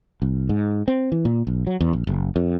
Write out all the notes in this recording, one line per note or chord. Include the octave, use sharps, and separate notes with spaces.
C2
G#2
C4
E3
A#2
B1
F#3
E2
A#1
F#1
F2